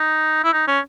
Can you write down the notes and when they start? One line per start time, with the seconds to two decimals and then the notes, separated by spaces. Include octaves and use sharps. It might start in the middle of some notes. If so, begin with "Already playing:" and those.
Already playing: D#4
0.44 E4
0.53 D#4
0.67 C#4